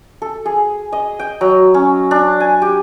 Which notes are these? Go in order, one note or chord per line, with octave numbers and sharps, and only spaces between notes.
A4
G#4
D#5
G5
F#3
C#4
D4
G#5
G4